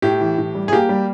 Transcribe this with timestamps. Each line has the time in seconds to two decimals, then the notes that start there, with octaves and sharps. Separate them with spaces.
0.02 A2 G4
0.21 E3
0.38 A2
0.55 G3
0.68 G#4
0.72 A#3 G4
0.89 G3